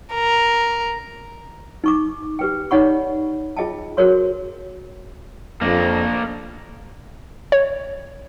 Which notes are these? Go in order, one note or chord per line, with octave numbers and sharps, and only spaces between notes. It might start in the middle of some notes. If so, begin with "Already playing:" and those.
A#4
D#4 C#6 D6
G4 B4 G5
D#4 C#5 D5 F#5 B5 C#6
F4 G#4 D#5 G5 A5
F#4 G#4 A#4 C5 C#5 C6
F2 A#3 D4
C#5